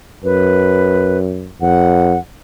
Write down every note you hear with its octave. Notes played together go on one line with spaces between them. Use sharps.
F#2 B4
F2 F#5